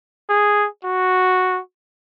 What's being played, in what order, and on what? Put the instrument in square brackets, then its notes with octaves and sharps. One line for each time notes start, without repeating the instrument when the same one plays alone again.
[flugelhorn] G#4
F#4